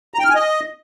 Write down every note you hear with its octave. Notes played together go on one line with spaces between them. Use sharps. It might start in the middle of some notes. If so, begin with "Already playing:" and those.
A#5
G5
F6
G#5
D#5